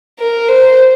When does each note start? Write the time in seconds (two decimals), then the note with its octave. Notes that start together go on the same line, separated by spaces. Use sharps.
0.19 A#4
0.48 C5